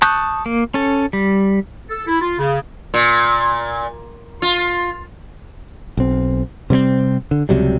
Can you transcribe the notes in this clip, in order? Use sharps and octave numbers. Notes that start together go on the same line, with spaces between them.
A5 C#6 D#6 F#6 G6
A#3
C#4 A4
G3
A4
E4
F4
C#3
A#2
F4
B1 C4
C3 G3 A#3 C4
D3
C#2 C3 F#3 G3